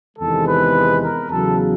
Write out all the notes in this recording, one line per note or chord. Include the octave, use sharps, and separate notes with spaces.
E2 C3 D#3 G#3 A4
B4
A#4
E2 C#3 F#3 A4